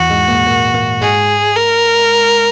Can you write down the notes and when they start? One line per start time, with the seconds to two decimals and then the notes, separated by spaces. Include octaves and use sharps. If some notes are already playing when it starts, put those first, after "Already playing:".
Already playing: E2 E3 F#4
0.09 G#2 G#3
0.28 A#2 A#3
0.46 A#2 A#3
0.74 A#2 A#3
1.01 G#2 G#3 G#4
1.55 A#4